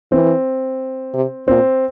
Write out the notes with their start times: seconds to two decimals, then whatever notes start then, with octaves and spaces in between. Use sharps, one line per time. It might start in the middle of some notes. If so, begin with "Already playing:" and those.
0.12 E3 C4
1.14 C3
1.48 A#2 C4